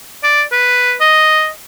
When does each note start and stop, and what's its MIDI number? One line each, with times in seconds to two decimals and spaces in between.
0.24 0.43 74
0.52 0.94 71
1.00 1.49 75